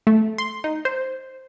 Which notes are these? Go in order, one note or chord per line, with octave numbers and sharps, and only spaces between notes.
A3
C6
D#4
C5